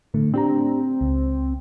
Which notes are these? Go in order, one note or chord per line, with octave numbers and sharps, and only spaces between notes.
A2 D3 A3
C4 D4 G4 A#5
C#2